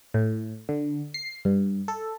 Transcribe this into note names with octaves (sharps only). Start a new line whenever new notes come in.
A2
D3
C7
G2
A4